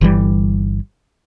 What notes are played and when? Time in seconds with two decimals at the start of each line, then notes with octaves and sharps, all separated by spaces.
0.01 G1 E3 G3